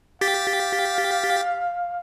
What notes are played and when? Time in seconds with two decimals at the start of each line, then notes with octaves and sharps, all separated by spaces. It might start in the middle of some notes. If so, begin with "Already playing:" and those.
0.21 G4 F5 A6 B6